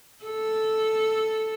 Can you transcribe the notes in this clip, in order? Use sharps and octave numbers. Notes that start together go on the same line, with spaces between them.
A4